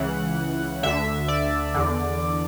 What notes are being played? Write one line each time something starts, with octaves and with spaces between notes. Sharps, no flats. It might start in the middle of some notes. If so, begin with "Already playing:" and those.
Already playing: C#2 C#3 E3 F#5
D2 D3 E5
D5
E2 D3